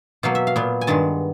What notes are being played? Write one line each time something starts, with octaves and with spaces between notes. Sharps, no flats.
B2 F#3 A#3 F5
E5
F5
A#2 F#3 B3
G#5
G2 D#3 G#3 A5